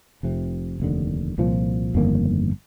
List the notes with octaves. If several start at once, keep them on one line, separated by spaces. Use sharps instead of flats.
F1 F2 C3
F1 D#2 D3
C2 A#2 F3
G1 F2 D#3 A#3